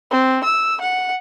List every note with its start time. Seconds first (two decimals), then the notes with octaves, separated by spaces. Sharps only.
0.11 C4
0.44 E6
0.81 F#5